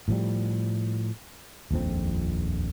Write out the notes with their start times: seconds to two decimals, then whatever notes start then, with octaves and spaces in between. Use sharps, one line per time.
0.08 A2 F3 G3
1.71 D#1 A#1 F2 C4